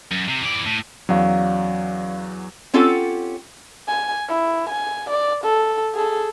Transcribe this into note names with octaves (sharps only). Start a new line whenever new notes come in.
F#2
C3
E3 D5
A2
E2 F#3 C#4 D5 F5
C4 C#4 F4 G4 A4 F#5
G#5
E4
G#5
D5
A4
G#4 A4